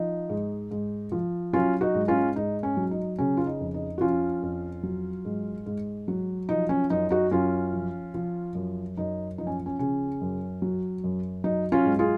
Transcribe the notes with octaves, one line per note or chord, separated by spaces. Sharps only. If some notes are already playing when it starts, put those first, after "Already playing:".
Already playing: F3 D#4
G#2
G#2
F3
F#3 C#4 F4
D#4 F#4
G#2
C#4 F4
G#2 D#4
C#4
F#3
D#4
C#3 C#4
F4
D#4
F2
D#4
F#4
F3 C#4 F4
F2
F#3
G#2
G#2
F#3
F3 D#4
C#4
F#2 D#4
D#4 F#4
F#2 C#4 F4
F3
F3
F#2
F#2 D#4
F3 D#4
C#4
C#4
C#3 C#4
F#2
F#3
F#2
F#3 D#4
C#4 F4
G#2
F4 G#4